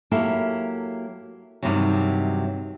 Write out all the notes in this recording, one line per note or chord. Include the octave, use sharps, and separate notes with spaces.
F#3 A#3 E4 G4 A4
G2 C3 D#3 E3 F#3